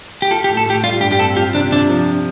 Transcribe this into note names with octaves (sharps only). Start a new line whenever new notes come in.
G4
F4 A4
G4
A2
A4
A2 G4
G3 F4
G2 G4
G4
C4 A4
F4 G4
C3 D4
C3 D4
F3